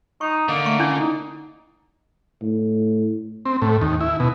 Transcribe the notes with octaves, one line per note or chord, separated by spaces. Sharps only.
D#4 C#6
D3 A#3
A3 C#6
C#4 D4 E4
D#4
A2
C4
A2
D#2
E4
B2